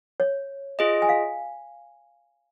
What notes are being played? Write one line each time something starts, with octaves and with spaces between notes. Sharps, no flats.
C#5
F4 G#4 D#5
G#5
F5